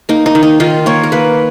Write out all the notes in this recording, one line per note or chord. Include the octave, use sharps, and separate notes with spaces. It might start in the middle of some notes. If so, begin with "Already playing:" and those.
A#3 D#4
D#4
D#3
D#4
D#3 F4
A#3 C#5
A#4
A#3 B4